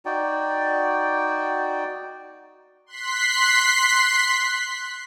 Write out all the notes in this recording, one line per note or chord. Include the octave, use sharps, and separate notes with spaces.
D#4 F#4 D5 G5
C6 F#6 B6 C7